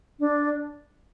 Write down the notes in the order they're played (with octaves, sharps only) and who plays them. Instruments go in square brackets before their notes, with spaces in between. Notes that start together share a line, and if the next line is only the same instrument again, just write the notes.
[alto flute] D4